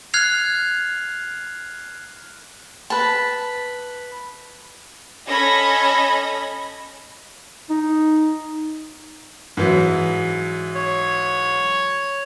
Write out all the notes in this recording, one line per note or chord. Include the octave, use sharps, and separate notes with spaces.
F6 F#6 G#6 C7 F7
B4 A5
C#4 A4 D#5 B5 G#6 A#6
D#4
G#2 E3 F#3
C#5